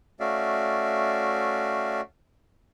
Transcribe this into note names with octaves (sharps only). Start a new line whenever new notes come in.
A3 C#4 F#4 D5 E5 F5